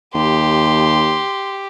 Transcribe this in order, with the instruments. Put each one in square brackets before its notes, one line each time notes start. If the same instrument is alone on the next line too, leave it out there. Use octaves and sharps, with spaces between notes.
[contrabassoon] D#2 [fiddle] G4 [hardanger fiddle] C6